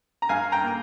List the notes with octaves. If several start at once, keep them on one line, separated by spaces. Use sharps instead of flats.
A#5
G2 F5 G#5
G5 A#5
A#3